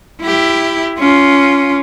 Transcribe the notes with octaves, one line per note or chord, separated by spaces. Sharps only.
E4 G4
C#4 F4